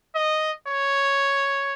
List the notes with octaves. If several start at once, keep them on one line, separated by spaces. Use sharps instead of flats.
D#5
C#5